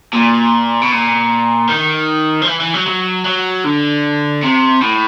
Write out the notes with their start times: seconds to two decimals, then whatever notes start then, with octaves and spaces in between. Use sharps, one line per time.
0.13 A#2
0.81 B2
0.91 A#2
1.69 D#3
2.42 F3
2.48 E3
2.60 E3
2.74 F#3
2.86 F#3
3.25 F#3
3.64 D3
4.43 C3
4.82 A2